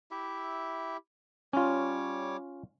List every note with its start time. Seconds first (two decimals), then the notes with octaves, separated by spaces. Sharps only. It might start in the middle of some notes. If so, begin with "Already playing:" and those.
0.11 E4 G4 E5
1.53 G3 C#4 F4 C#5 D6